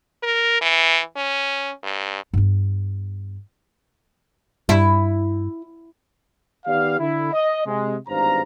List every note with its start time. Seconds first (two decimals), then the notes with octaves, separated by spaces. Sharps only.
0.23 A#4
0.62 E3
1.16 C#4
1.84 G2
2.33 G2 B3
4.69 G2 E4
6.66 D#3 B3 G4 D5 F5
6.99 D3 E4
7.33 D#5
7.66 C3 G#3
8.09 G#1 E2 G2 C5 F5 A#5